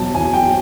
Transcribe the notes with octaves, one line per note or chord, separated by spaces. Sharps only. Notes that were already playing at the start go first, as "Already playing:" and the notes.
Already playing: E2 B2 F#3 A5
E2 G#5
G5
F#3